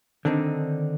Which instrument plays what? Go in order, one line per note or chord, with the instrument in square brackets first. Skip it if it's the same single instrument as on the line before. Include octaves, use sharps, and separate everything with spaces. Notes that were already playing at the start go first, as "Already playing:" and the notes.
[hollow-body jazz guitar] D3 D#3 C4 D4 D#4